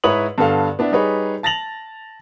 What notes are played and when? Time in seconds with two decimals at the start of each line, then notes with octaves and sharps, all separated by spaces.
0.04 G#2 E4 B4 C#5 D#6 F#7
0.38 G2 D3 B3 A4 F5
0.79 B3 D4 E4
0.92 G3 D#4 G#4 B4 C#5
1.43 A5 A6 A#6 F7 F#7